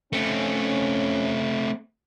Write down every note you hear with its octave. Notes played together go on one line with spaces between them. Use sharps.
A3 C4 C#4